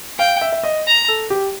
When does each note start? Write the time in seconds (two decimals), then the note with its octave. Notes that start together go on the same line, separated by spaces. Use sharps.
0.19 F5 G5
0.41 E5
0.52 E5
0.64 D#5
0.86 A#5
1.08 A4
1.30 G4